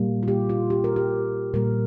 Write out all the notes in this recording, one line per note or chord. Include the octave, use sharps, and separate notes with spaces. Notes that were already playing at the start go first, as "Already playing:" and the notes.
Already playing: A#2 G3 A#3
F4
G4
F4
G4
A#4
G4
A#2 G3 A#3 A#4